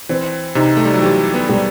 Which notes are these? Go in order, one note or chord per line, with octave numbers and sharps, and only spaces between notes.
E3 C4
C3 D#4
A3
G3
F#3
E3 G4
B3
G3